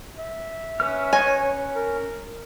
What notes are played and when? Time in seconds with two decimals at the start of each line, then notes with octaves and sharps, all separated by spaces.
0.18 E5
0.80 C#4 B4 F6
1.13 C#5 D#5 G#5
1.76 A#4